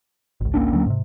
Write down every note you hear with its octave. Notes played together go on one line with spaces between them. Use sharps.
G#1 C#2
A#3 C#4 D4
D2 F#3
G#2 C3